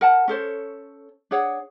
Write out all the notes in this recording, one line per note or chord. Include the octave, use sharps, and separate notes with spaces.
A#4 F#5 A5
C#4 A4 C5 C#5
D4 G#4 C#5 F#5